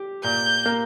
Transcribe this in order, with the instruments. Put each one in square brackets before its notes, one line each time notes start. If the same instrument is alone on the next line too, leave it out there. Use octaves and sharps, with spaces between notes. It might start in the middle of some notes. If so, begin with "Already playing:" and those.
Already playing: [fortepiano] G4
[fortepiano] A#2 [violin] G6
[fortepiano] A#3